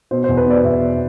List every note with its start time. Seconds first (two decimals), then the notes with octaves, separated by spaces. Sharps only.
0.11 B2 C5
0.24 E2 C5
0.37 B4
0.46 B2 D5
0.64 E2 E5
0.82 E2